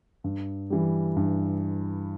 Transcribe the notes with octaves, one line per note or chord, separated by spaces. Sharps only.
G2
E3 G3
G2